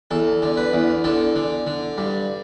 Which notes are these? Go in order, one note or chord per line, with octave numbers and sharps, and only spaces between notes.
E2 A4
D3
B4
E2
D3 A4
D3
D3
G2